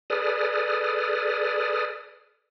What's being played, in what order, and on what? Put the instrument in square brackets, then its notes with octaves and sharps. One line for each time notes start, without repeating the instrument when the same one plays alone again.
[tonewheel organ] G#4 A4 B4 D5 D#6 F6